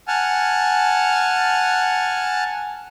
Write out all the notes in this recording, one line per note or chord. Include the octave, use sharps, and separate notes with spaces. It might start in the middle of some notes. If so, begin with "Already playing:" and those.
F#5 G#5 A5 F6